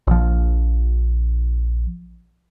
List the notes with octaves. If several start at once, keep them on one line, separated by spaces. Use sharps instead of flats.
A#1 F3